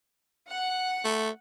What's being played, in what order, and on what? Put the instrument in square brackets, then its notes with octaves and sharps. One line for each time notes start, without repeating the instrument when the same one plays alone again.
[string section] F#5
[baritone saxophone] A3